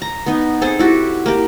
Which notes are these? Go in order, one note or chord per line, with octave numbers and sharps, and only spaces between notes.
A#5
B3 D#4
C4 G#4 A4 C5
E4 F#4 G4 A4
A#3 G4